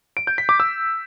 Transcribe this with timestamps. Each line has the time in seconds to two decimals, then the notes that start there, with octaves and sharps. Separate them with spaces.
0.17 D7
0.27 G6
0.38 B6
0.49 D6
0.60 E6